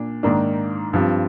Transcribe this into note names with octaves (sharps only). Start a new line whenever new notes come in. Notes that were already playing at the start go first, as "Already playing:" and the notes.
Already playing: A#2 D4
G#2 D#3 A#3 D4
G2 F3 C4